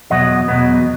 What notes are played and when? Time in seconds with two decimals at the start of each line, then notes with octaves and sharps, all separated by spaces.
0.10 E2 B2 F#3 B3 D#5 F#5
0.48 E2 B2 F#3 B3